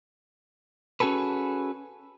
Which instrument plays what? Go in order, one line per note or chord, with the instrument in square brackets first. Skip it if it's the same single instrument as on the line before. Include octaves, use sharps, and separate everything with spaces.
[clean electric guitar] C#4 F#4 G#4 A4 B4